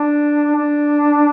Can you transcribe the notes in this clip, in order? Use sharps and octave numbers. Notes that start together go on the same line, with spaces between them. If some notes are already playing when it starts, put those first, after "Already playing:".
Already playing: D4
D4